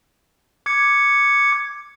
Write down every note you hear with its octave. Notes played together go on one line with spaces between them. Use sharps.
D6 G#6 C#7